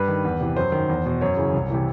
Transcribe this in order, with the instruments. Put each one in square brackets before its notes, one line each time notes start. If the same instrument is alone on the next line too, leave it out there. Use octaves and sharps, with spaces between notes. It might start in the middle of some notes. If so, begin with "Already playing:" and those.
Already playing: [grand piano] G2 B4
D#3
E2
C3 E3
F#2 C5
D#3
E2
B2
F#2 C#5
C#3 E3
C2
C3 E3